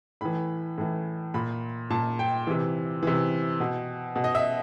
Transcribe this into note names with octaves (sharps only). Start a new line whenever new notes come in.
A2 E3 B5
A2 E3
A#2 B5
A#2 A5
G5
C3 E3
C3 E3
B2
B2
D#5
E5